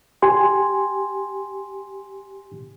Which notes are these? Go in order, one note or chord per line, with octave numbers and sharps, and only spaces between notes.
G4 G#5 C6